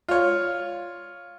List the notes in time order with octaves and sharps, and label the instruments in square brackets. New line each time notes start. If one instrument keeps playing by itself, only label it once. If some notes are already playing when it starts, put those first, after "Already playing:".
[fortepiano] F4 C#5